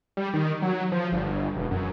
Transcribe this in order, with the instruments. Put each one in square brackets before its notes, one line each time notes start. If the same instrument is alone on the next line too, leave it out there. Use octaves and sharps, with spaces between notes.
[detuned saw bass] G3
D#3
F#3
F3
G1
E1
F#2